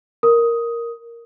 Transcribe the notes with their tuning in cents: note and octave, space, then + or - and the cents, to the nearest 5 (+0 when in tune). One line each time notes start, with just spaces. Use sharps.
A#4 +0 D#6 +10